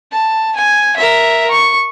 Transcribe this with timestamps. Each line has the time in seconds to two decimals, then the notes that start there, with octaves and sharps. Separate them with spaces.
0.12 A5
0.56 G#5
0.97 A#4 E5
1.51 C#6